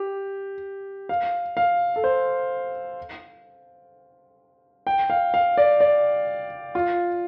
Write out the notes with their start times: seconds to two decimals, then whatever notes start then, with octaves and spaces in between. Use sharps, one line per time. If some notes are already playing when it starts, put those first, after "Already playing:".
Already playing: G4
1.09 F5
1.57 F5
1.96 A4
2.04 C5
4.87 G5
5.10 F5
5.34 F5
5.57 D5
5.80 D5
6.75 F4